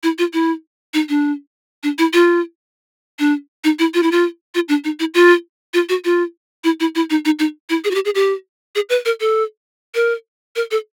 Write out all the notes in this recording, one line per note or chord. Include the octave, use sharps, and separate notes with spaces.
E4
F4
E4
D#4
D4
D4
E4
F4
D4
D#4
E4
F4
E4
F4
F4
D4
D#4
E4
F4
F4
F#4
F4
E4
E4
E4
D#4
D#4
D#4
E4
G#4
F#4
G4
G#4
G4
G#4
B4
A#4
A4
A#4
A#4
A4